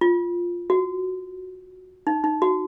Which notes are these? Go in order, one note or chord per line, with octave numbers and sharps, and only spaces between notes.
F4
F#4
D#4
D#4
F#4